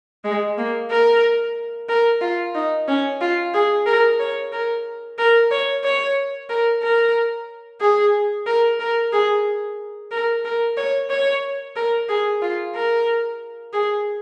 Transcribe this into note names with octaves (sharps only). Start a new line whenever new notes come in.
G#3
A#3
A#4
A#4
F4
D#4
C#4
F4
G#4
A#4
C#5
A#4
A#4
C#5
C#5
A#4
A#4
G#4
A#4
A#4
G#4
A#4
A#4
C#5
C#5
A#4
G#4
F4
A#4
G#4